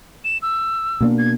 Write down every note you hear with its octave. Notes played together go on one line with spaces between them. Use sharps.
E7
E6
B2 A#3 D4
G#6